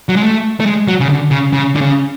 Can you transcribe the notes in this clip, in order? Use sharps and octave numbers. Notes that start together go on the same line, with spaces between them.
F#3
G#3
A3
A3
G#3
F#3
C#3
D3
C#3
C#3
D3
C#3